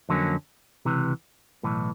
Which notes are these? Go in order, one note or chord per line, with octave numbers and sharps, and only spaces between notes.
F2 D3 F#3 A#3 C#4
C#2 C3 E3
B1 A2 E3